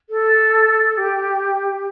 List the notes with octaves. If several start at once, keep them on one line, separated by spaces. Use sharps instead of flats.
A4
G4